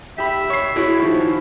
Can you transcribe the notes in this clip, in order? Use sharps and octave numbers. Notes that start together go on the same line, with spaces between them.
G4 E5 B5
C#5 C#6 C7
E4 F#4 G#4 C#5
D#3 F3